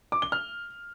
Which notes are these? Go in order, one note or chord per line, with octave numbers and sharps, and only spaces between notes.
D6
G7
F6